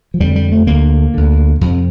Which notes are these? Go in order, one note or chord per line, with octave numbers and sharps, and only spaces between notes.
F3
F2 D3 G3
G3
A3
D2 D3 A#3
D2 D3
F2 C3